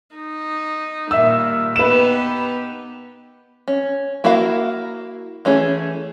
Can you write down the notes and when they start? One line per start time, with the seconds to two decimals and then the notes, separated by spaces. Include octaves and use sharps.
0.17 D#4
1.11 A#2 D#3 G3 E5 E6
1.76 B3 D#4 G4 B4 E7
3.68 C#4
4.24 A#3 E4 F#4 A#4 F5
5.45 E3 A3 C#4 G#4